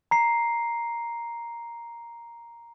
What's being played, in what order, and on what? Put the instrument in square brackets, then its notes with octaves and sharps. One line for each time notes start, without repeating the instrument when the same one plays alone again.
[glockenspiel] A#5 C7